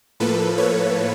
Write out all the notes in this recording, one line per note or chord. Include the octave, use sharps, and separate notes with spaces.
A2 F3 A#3 A4 B4
B4 C#5